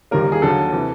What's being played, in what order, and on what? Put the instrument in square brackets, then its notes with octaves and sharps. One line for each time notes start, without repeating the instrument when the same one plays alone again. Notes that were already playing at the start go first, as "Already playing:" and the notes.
[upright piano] D#2 D#3 G3 A#3 A#4
G#4
D#2 D3 F#3 A4
C3 E3